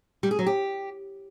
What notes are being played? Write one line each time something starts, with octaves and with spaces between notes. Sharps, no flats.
G3
G#4
F#3
G4